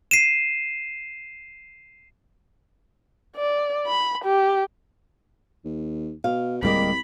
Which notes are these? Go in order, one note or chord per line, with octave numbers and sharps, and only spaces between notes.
C7 D#7 E7
D5
B5
G4
D#2
B2 F5
D1 C2 G3 G#3 A#3 G4 D#5 B5